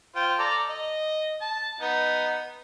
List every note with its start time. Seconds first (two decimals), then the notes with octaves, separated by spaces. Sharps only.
0.16 F4 C5 G5
0.39 A4 D5 A#5
0.69 D#5
1.41 A5
1.81 B3 D#4